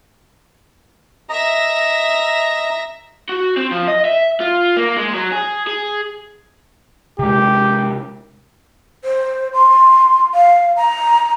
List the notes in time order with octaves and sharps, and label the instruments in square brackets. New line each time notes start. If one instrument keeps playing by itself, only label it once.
[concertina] D#5 A#5 [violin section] E5 A#6
[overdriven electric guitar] F#4
C4
F3
D#5
E5
F4
A#3
G#3
F#3
G#4
G#4
[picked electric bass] C3 G#3 [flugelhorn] G4
[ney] C5
C6
F5
A#5